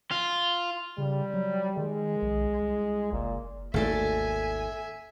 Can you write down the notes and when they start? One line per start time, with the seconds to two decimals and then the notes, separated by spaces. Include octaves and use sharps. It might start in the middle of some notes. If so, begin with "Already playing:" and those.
0.11 F4
0.98 C#3 G3
1.34 F#3
1.77 D#3 G#3
2.22 B1
2.62 C2
3.12 F#1 A#2
3.74 G#1 D#2 A3 A4 D5 E5 G#5